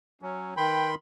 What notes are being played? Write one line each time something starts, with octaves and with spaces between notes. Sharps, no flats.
F#3 C#4
D#3 B4 G5 B5 C6